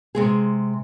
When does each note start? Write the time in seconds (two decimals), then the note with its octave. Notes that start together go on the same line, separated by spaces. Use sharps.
0.15 C3 G#3 G#4